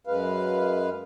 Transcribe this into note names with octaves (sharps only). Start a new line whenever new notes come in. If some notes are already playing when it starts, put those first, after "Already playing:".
F#2 G#3 B4 F5